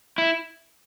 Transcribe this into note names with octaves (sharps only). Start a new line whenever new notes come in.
E4